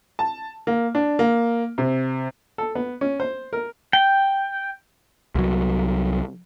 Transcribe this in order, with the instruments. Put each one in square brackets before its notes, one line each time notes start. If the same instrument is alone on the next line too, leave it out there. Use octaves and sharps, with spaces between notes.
[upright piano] A5
A#3
D4
A#3
C3
[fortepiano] A4
B3
C#4
C5
A#4
[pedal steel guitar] G5
[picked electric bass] C2 F#3